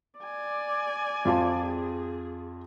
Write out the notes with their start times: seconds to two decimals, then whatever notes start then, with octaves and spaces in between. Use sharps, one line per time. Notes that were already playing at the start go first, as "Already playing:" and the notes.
0.20 D5 G#5
1.25 F2 F4 A5
1.67 G#4